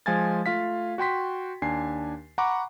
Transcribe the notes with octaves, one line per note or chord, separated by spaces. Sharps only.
F3 G#3 F5 G#5 G#6 A6
A3 F4 F5 B6
F#4 G5 C6 B6
D#2 D4 G#5 C7
F#5 A#5 B5 C#6 D6